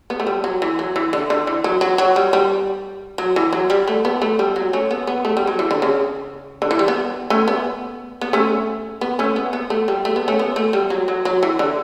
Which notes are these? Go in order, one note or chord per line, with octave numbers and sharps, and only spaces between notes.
B3
A3
G3
F#3
E3
F#3
E3
D3
D3
E3
F#3
F#3
F#3
G3
G3
F#3
E3
F#3
G3
A3
B3
A3
G3
F#3
A3 C#4
B3
B3
A3
G3
F#3
E3
D3
C#3
D3
E3
G3
B3
A3 C#4
B3
B3
A3 C#4
B3
A3 C#4
B3
B3
A3
G3
A3
B3
A3 C#4
B3
A3
G3
F#3
F#3
F#3
E3
D3